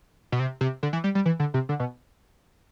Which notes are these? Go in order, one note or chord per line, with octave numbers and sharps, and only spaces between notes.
B2
C3
C3
D3
E3
G3
G3
E3
D3
C3
D3
B2